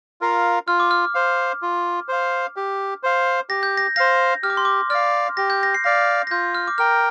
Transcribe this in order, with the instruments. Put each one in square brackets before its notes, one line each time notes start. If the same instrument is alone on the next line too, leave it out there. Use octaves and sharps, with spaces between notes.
[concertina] F4 A#4 F5
[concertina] F4 [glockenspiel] F6
[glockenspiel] D6
F6
[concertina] C5 F5
F4
C5 F5
G4
C5 F5
[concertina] G4 [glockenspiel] A#6
[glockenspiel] G6
A#6
[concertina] C5 F5 [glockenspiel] A#6
[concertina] G4 [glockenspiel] F6
[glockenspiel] D6
C6
D6
[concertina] D5 F5 [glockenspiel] F6
[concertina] G4 [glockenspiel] A#6
[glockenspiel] G6
A#6
C7
[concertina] D5 F5 [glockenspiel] A#6
[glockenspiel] A#6
[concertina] F4 [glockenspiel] G6
[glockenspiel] F6
D6
[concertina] A#4 G5 [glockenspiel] F6